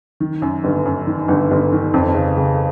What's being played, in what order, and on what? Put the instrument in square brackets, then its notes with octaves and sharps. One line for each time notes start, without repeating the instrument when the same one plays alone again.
[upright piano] D#3
F#2
G1
F#2
D#3
G1
G1
D#3
F2
C#3
C#3